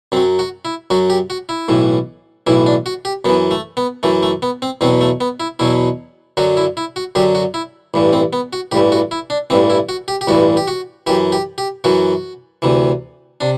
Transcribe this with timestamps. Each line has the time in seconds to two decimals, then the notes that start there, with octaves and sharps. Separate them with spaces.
0.12 F#2 C4
0.17 F#3
0.39 F#4
0.65 E4
0.90 F#2 F#3 F#4
1.10 G4
1.30 F#4
1.49 E4
1.68 B1 A2 E3
2.47 B1 A2 E3 E4
2.66 D4
2.86 F#4
3.05 G4
3.25 F#2 B3
3.29 E3
3.51 A3
3.77 B3
4.03 F#2 E3 A3
4.23 A3
4.42 B3
4.62 C4
4.81 E2 B2 F#3 C4
5.01 A3
5.21 B3
5.40 E4
5.59 E2 B2 F#3 E4
6.37 F#2 D3 F#3 F#4
6.57 E4
6.77 E4
6.96 F#4
7.15 F#2 D3 F#3 G4
7.35 F#4
7.54 E4
7.94 A1 G2 E3
8.13 C4
8.33 B3
8.53 F#4
8.72 A1 G2 E3 G4
8.92 F#4
9.11 E4
9.30 D4
9.50 A1 G2 E3 C4
9.70 E4
9.89 F#4
10.08 G4
10.21 G4
10.28 A1 G2 E3 F#4
10.57 G4
10.68 F#4
11.07 F#2 E3 G4
11.32 G4
11.58 G4
11.84 F#2 E3 F#4
12.62 D2 C3 E3
13.41 C3 D4